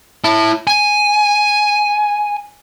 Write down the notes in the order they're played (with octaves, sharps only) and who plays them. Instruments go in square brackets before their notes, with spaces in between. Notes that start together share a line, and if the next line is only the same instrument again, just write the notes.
[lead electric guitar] E4 A5
G#5